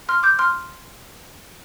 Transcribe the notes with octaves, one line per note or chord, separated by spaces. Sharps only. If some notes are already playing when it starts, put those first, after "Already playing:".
C6 F6
D6 G6
C6 F6